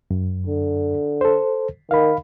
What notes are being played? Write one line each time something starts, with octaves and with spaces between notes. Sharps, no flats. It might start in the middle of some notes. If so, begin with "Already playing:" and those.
F#2
D3
A4 C5
D#3 F5 B5